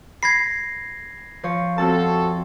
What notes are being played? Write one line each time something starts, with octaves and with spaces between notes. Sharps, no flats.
B5 G#6 A#6 C7
F3 C#5
F2 C4 F#4 A4 A5